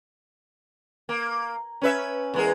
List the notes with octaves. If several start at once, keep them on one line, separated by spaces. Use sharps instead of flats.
A#3
C#4 B4 E5
E2 G#3 A#4